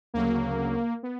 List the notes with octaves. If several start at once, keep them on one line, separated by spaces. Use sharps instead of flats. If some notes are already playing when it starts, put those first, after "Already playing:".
D2 C#3 F#3 A#3
B3